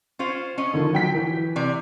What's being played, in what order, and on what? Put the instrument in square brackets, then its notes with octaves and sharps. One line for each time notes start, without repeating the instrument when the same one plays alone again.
[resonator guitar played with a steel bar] C#4 F4 C5
C#4 D#5
[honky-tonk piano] D3 D#3 F3
F#3 G5 B6
E3
[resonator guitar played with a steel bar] C3 D5